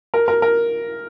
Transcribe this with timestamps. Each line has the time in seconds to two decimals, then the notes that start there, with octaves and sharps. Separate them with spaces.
0.14 A#4
0.28 A#4
0.42 A#4